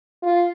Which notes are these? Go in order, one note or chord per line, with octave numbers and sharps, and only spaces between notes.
F4